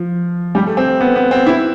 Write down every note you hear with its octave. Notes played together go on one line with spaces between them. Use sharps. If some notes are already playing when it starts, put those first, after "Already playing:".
Already playing: F3
G3
A3
C4
B3
B3
C4
E4